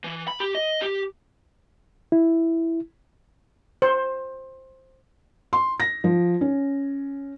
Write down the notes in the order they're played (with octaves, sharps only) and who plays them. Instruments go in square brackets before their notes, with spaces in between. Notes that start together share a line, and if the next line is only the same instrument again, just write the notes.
[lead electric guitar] E3
B5
G4
D#5
G4
[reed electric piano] E4
[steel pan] C5
[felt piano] C6
A#6
F3
C#4